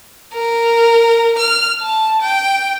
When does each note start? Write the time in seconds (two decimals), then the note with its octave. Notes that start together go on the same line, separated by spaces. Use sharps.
0.34 A#4
1.39 F6
1.81 A5
2.22 G5